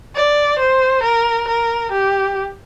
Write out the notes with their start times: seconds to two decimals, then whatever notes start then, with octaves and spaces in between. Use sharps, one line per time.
0.15 D5
0.59 C5
1.04 A#4
1.49 A#4
1.92 G4